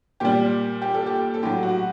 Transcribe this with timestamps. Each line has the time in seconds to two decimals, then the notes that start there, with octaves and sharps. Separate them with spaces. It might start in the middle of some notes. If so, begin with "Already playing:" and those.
0.20 A#2 G3 G4
0.82 G4
0.94 A4
1.06 G4
1.34 A4
1.43 A2 F#3 G4
1.63 F#4